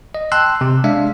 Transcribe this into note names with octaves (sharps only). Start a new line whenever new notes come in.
D#5
G5 A5 C6 E6 F#6
C3
G#3 D4 E5 F5